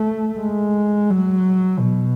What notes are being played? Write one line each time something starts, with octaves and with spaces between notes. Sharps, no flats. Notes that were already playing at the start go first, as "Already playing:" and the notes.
Already playing: A3
G#3
F#3
B2